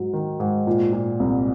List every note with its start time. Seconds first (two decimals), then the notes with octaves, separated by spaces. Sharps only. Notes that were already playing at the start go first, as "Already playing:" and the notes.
Already playing: G#2 F#3
0.13 D#3
0.40 G#2
0.67 A#2
0.93 A#2
1.20 C2